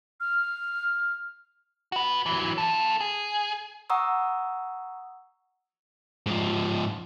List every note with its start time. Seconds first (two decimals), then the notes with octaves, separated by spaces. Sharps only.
0.20 F6
1.92 F#4 B4
2.26 E3 F#3
2.58 F4 A4
3.01 G#4
3.90 F#5 A#5 C#6 D#6 E6
6.26 G#2 F3